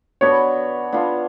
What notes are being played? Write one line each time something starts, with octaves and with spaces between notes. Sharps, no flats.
B3 D4 F#4 B4 C#5
B3 D4 F4